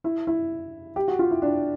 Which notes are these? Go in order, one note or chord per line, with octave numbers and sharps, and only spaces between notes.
E4
E4
G4
F#4
F4
E4
D4